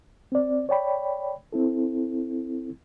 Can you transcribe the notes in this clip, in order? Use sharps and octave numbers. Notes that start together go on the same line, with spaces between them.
C4 D5
C#5 D5 G5 B5
C4 E4 A4